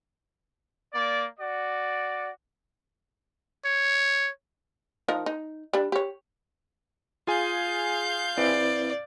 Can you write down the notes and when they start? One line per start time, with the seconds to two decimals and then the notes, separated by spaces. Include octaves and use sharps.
0.93 A#3 D5
1.40 F#4 D5
3.65 C#5
5.08 F3 D#4 A#4
5.26 D#4
5.74 G3 D4
5.92 G4 C#5
7.27 F4 G#4 F5 G#5 G6
8.38 C4 E4 B4 D5